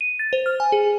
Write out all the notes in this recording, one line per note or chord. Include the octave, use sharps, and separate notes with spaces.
D#7
A6
C5
F6
G#5
G#4